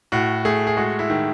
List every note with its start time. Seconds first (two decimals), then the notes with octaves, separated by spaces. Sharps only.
0.12 A2 F#4
0.45 A3 G#4
0.67 G#4
0.77 G#3 F#4
0.99 E4
1.10 D#3